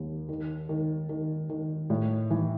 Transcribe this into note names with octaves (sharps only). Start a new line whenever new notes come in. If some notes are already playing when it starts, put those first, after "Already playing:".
Already playing: D#2
D#3
D#3
D#3
D#3
A2
E3